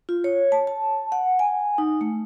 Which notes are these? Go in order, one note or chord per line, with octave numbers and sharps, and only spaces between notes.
F4
C#5
A5
A5
F#5
G#5
D#4
A3